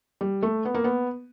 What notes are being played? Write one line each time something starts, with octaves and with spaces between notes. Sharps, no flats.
G3
A3
B3
A#3
B3